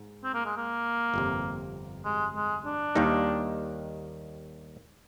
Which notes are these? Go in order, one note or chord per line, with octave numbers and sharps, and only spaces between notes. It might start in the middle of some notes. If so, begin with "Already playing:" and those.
Already playing: G#2
C4
A#3
G#3
A#3
G1 F2 C3
G#3
G#3
D4
D#2 D#3 G3 A#3 D#4